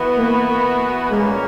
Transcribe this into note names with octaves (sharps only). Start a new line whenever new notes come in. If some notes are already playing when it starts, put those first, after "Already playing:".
Already playing: E3 B3 F#4
A#3
A#2 G#3 A#3 C#4